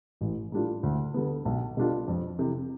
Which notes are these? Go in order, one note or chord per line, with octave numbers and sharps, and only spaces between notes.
A1
A2 G3 D4 F4
D2
D3 G3 B3
B1
B2 G3 D4 F4
F2
C3 E3